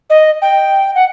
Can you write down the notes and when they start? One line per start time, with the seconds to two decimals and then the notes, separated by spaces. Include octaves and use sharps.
0.10 D#5
0.42 G5
0.95 F#5